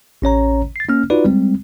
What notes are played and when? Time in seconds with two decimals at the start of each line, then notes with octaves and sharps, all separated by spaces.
0.22 A1 C#4 C#5 A#5
0.76 A6 C7
0.89 A#3 C#4 F6
1.10 D#4 F4 F#4 B4 D5
1.25 G3 G#3 C4